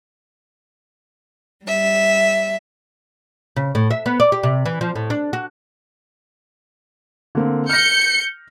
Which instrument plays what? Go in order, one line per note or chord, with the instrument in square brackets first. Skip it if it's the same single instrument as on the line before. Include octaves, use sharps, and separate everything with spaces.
[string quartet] G3 E5
[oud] C#3
A2
E5
B3
D5
G4
C3
E3
F3
A2
D4
F#4
[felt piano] D3 A#3 C4
[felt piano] F6 A#6 [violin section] G6 C#7